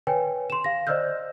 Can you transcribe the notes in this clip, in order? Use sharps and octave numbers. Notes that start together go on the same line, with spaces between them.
B4 C#5 G5 G#5
C6 E7
F5 A#6
C5 D5 D#5 E6 F6 G6